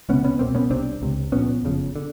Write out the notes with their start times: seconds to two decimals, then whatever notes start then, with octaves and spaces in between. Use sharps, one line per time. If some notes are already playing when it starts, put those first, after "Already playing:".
0.09 C#2 C3 B3 C#4
0.24 B3 C#4
0.39 C2 B2 A#3 C4
0.55 B3 C#4
0.70 C2 C3 C4 D4
1.02 C#2 C3
1.32 A#1 A#2 B3 C#4
1.63 F#1 F2 C#3
1.96 D3